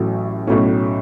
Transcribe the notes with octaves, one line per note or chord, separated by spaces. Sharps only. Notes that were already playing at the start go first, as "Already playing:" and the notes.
Already playing: A1 A2 F#3
B1 A2 F#3 A3 C#4